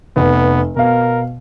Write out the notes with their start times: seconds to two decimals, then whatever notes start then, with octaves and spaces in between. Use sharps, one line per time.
0.17 F1 B3
0.76 B2 A#4 F5